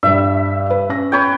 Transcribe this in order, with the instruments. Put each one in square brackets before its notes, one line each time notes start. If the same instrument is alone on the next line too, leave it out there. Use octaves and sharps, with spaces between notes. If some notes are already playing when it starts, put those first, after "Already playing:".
[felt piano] G2 G3 [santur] E5
[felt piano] B4
C#4 A#6
[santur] B4 C#5 G5